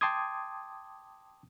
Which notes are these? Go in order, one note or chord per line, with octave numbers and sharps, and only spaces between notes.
G5 A5 C6 D6 D#6 G#6